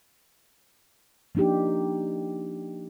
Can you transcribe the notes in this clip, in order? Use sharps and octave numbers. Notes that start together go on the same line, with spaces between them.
F3 A#3 D4 D#4 G4